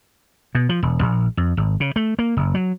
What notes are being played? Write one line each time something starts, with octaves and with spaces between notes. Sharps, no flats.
B2
F3
E1
A#1
F2
G#1
C#3
A3
A#3
F#1
F#3